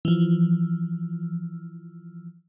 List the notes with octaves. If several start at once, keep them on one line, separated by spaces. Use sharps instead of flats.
E3 F3